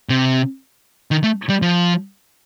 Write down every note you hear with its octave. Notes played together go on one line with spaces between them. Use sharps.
C3
D#3
A3
G3
F3